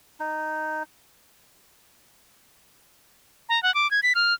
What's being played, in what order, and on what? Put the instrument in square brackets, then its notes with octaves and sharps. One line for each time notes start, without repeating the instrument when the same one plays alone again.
[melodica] D#4
[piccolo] A#5
F#5
D6
G#6
B6
F6